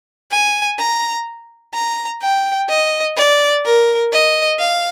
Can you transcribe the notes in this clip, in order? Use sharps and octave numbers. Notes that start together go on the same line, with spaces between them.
G#5
A#5
A#5
G5
D#5
D5
A#4
D#5
F5